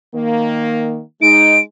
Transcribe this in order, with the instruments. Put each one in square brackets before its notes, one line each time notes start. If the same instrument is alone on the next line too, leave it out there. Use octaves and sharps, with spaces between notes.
[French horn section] D#3 A#3
[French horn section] G#3 D#4 [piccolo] D7